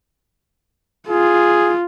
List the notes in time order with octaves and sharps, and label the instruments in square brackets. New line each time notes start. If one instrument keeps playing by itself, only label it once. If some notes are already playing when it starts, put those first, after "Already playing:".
[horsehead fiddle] F4 [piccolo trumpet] G#4